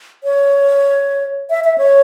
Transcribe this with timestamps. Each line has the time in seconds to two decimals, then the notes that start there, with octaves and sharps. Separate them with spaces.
0.24 C#5
1.50 E5
1.64 E5
1.78 C#5